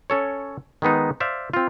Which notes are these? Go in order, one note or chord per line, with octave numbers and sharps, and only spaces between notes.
C#4 A4 C#5
D#3 G#3 B3 D#4
C5 D5 E5 F5
C4 F4